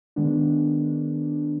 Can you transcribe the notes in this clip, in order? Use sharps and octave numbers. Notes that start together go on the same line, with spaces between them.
D#3 G#3 B3 D4